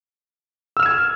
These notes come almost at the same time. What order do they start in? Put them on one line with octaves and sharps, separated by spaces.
E6 F6 E7 G#6